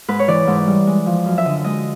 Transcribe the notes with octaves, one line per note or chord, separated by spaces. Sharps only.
G#2 B4
C#5
E3 D5
G#2
G3
G#3
F3
F#2
E5
D3 D#5
G#3 D#5